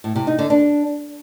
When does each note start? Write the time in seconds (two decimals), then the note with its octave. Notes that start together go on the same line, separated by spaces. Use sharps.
0.04 A2
0.16 C3
0.27 D#4
0.39 D3
0.50 D4